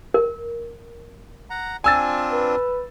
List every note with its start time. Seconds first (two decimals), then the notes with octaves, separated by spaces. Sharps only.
0.14 A#4
1.50 F#5 A#5
1.84 C4 D4 F4 G#5 E6 A6
2.32 B4